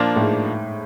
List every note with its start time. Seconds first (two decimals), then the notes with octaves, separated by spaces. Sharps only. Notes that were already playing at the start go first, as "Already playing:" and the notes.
Already playing: A#2 F3 A#3 D4
0.16 A2
0.20 G#2